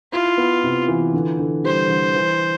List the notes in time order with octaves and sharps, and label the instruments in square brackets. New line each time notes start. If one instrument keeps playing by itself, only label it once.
[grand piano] E4 [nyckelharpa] F4
[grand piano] B3
C3
E3
D3
D3
[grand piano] G3 [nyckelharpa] C5
[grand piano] D3
E3